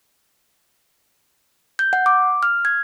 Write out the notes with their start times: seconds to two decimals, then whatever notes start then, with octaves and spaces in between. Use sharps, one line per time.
1.79 G6
1.93 F#5
2.06 D6
2.43 F6
2.65 G#6